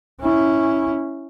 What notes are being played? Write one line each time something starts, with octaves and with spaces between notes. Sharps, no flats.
C#4 E4